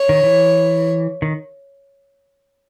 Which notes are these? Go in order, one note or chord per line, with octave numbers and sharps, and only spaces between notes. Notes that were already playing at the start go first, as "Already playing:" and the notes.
Already playing: C#5
D#3
E3
D#3